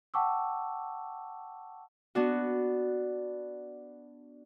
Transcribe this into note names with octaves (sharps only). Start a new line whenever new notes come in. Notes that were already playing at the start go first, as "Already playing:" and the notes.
F#5 G5 A5 C#6 D6 E6
B3 D4 F#4